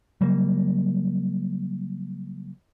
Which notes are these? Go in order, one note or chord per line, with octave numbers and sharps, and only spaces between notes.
C#3 F#3 G3 A#3